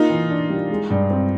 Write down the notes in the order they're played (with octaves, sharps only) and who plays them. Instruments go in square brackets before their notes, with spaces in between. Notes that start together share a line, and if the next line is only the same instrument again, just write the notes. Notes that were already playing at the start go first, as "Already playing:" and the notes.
Already playing: [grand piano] A#3 [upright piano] D#4 F4
[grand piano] E3
D4
G3
G#3
G2
C4